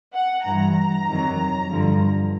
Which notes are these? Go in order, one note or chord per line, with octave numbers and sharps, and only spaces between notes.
F#5
G2 E3 A#5
F2 C3 D#3 F#3
G2 D3 F3